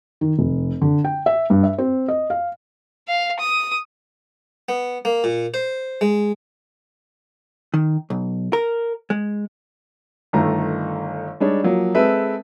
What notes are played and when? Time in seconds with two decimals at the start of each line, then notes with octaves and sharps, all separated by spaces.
0.21 D#3
0.39 F1
0.82 D3
1.05 G5
1.26 E5
1.50 G2
1.63 E5
1.78 C4
2.08 D#5
2.30 F5
3.08 F5
3.39 D#6
4.69 B3
5.05 A#3
5.24 A#2
5.54 C5
6.01 G#3
7.74 D#3
8.10 B1
8.53 A#4
9.10 G#3
10.33 G1 D#3 A3 A#5
11.40 G3 G#3 D4 D#4 C#5
11.64 F3 F#3 A#3
11.95 G#3 C4 A4 B4 E5